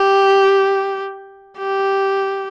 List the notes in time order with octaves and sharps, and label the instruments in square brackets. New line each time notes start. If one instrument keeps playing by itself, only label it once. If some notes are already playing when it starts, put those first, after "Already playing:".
Already playing: [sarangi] G4
G4